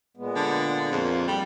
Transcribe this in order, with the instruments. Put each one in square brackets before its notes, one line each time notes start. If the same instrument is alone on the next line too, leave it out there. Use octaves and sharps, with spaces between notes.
[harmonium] A#2 G#3 B3
[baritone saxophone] D3
[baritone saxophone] F2 [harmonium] A#3
[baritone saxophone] G3